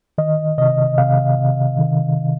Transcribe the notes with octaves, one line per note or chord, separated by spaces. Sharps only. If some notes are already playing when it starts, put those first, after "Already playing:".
D#3 D#5
C3 D#5
C3 F5
C3
D#3